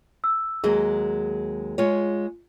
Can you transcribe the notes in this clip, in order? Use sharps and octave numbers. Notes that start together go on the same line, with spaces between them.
E6
D#2 F#3 G#3 G#4
G#3 F4 C#5